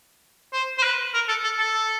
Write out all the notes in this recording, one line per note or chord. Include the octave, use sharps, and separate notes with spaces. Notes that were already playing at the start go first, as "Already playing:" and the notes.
C5
C5
B4
A#4
A4
A4
A4